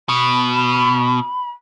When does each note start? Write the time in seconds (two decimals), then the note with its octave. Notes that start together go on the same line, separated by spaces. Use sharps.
0.09 B2 B5